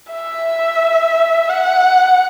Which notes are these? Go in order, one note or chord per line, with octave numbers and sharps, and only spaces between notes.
E5
F#5